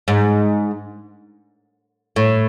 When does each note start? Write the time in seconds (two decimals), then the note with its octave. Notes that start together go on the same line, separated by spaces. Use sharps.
0.08 G#2
2.16 A2